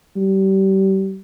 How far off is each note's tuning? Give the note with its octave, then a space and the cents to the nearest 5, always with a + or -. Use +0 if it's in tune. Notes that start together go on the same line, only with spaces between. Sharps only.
G3 -30